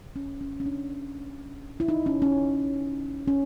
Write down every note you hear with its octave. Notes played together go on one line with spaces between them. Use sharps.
C#4
C#4
C#4
D4
E4
D#4
C#4
C#4
C#4